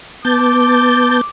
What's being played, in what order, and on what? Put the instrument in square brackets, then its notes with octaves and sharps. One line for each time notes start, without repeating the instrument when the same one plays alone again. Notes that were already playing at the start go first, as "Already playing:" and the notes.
[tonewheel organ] B3 A5 G6 [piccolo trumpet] D6